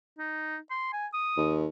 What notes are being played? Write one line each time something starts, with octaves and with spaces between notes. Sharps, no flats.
D#4
C6
G#5
D#6
D#2